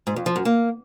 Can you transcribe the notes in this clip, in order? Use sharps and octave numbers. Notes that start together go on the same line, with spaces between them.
G#2
F2
F3
F#2
A#3